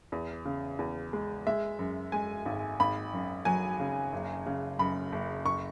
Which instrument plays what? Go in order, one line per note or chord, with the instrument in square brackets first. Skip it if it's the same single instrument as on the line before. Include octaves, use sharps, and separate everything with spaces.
[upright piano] E2
C#3
E2
G#3
G#3 E5
F#2
G#3 G#5
G#1
G#1 B5
F#2
F#3 G#5
C#3
F#1
C#3
F#2 B5
F#1
F#1 C#6